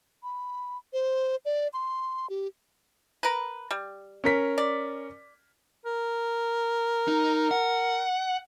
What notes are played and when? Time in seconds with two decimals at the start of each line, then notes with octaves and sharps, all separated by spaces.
0.23 B5
0.93 C5
1.45 D5
1.73 C6
2.30 G4
3.23 A#4 B4
3.71 G3
4.24 C#4 A#4 B6
4.58 D5
5.86 A#4
7.08 D#4
7.51 F#5